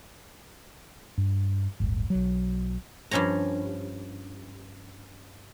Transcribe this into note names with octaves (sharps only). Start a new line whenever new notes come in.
G2
D1 G1
B1 F#3
G2 F3 C#4 C#5 A#5